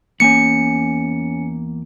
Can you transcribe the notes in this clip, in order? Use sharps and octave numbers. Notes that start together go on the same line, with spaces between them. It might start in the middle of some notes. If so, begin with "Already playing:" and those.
E2 A#3 C#4 G#5 C#7